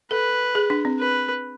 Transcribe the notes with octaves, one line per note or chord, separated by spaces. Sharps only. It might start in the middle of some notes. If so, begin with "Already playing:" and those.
A4 B4
G#4
D4
C4
B4